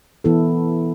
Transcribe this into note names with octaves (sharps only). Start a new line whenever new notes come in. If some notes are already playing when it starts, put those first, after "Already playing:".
E3 B3 E4 A4